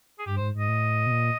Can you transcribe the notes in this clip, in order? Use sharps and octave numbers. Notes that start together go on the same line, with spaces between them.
G#4
G2 G4
G#2 C5
G#2 D#5
A2
B2
A#2